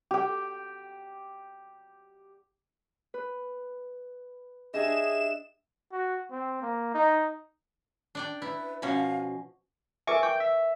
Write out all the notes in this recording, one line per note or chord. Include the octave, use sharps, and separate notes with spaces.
G4 G5
B4
D4 G4 G#4 D#5 E5 E7
F#4
C4
A#3
D#4
D4 D5 G5
E4 B4
B2 F3 C#4 F5
A#4 B4 E5 G#5 C#6 D6
G5 C#6
E5